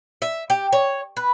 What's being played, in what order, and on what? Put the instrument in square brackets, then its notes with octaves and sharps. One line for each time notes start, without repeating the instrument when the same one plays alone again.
[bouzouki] E5
G4
C#5
B4